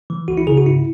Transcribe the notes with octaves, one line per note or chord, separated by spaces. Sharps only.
E3
C#2 F#4
E4
C#3 G#4
F#4
G#2 E4